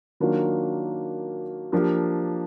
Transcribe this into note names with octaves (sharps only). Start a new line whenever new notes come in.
D#3 F#3 A#3 D4 F4
F3 A#3 D4 G4